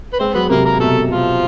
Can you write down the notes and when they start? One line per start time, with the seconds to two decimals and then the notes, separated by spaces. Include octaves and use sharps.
0.13 B4
0.19 G#3 C4 C5
0.34 F#3 B3 B4
0.49 C3 A#3 A#4
0.65 A#3 A#4
0.79 B2 A3 A4
1.10 F3 F4